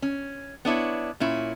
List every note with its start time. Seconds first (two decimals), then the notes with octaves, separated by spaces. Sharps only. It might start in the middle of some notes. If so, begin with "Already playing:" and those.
0.02 C#4
0.65 B3 D4 E4 C#5
1.20 A#2 C#4 E4